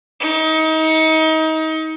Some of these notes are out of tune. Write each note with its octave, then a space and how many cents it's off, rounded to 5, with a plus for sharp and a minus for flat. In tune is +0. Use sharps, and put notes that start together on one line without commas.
D#4 +30